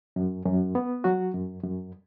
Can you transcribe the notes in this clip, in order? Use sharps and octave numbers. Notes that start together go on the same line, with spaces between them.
F#2
F#2
B3
F#3 F#4
F#2
F#2